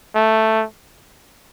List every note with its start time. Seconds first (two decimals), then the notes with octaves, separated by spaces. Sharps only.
0.15 A3